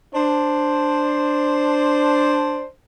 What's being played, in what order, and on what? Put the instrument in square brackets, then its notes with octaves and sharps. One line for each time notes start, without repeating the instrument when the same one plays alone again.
[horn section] D4 C5